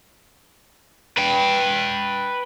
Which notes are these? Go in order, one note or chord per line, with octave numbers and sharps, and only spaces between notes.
B4 G5